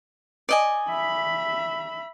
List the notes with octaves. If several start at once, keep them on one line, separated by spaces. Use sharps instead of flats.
D5 D#5 G#5
E5 B5